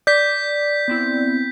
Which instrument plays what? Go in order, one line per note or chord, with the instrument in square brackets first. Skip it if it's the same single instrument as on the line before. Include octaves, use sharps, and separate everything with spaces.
[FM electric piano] D5 [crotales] G6 B6
[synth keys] B3 C4 E4